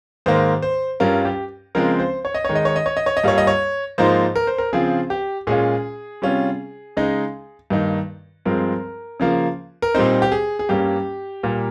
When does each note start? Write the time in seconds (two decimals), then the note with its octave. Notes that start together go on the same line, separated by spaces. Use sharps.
0.26 G#2 D#3 A#3 C5
0.62 C5
1.00 G2 G3 C#4 F4 A#4
1.25 G4
1.75 C#3 F3 G#3 C4 F4 A#4
1.99 C5
2.25 C#5
2.35 D#5
2.45 D#3 G#3 D#4 C#5
2.55 D#5
2.65 C#5
2.76 D#5
2.86 C#5
2.97 D#5
3.06 C#5
3.17 D#5
3.24 G2 G3 A#3 F4 C#5
3.38 D#5
3.47 C#5
3.98 G#2 F3 A#3 D#4 C5
4.36 A#4
4.47 C5
4.58 A#4
4.73 C#3 F3 C4 F4 G#4
5.10 G4
5.47 A#2 G#3 C#4 F4 G#4
6.22 C3 G3 C#4 F4
6.97 C#3 G#3 D#4
7.70 G2 D#3 A#3 D#4
8.45 G2 F3 G#3 C4 A#4
9.20 C#3 F3 A#3
9.82 A#4
9.95 A#2 G3 C4 D#4 C5
10.22 G4
10.32 G#4
10.59 G#4
10.69 G2 G3 A#3 C#4 G4
11.43 A#2 G3 A#3